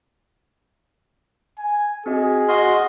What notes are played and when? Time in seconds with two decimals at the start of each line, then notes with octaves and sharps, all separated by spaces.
1.58 G#5
2.06 C4 F#4 G#4 D#5
2.49 F#4 D#5 C6 F6